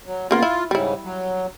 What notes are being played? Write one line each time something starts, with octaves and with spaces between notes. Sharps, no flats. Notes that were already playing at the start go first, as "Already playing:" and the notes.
F#3
C#3 A#3 B3 F4
E4
G#2 C#3 G3 E4
F#3